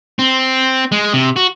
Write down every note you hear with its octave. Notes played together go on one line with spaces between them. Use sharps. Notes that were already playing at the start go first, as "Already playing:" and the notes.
C4
G#3
C3
F#4